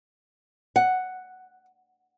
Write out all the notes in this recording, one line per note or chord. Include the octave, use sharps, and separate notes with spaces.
F#5